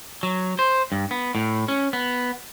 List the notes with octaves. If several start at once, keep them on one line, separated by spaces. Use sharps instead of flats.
F#3
C5
G2
B3
A2
C#4
B3